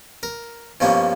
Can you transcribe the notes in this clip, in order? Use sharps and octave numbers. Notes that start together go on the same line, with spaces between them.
A#4
G2 B2 F3 A#3 C#4